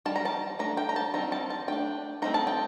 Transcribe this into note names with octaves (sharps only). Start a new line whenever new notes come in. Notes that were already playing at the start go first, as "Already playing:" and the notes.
D#3 G3 A5
A#5
A5
A3 D4 A#5
G5
A#5
A5
D#3 G3 C4 A#5
A5
A5
A3 D4 G5
A3 C4 D#4 A#5
A5
G5